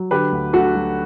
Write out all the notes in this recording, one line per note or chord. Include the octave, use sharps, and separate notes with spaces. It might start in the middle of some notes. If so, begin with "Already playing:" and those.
Already playing: F#3
D3 G4 B4
D2
D2 F#4 A4
F#3